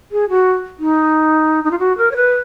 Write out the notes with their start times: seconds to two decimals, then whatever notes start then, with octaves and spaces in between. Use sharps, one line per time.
0.12 G#4
0.29 F#4
0.79 D#4
1.64 D#4
1.71 F4
1.79 F#4
1.98 A#4
2.11 C#5
2.16 B4